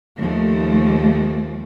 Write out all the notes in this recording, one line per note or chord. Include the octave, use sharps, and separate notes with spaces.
D#2 F3 A3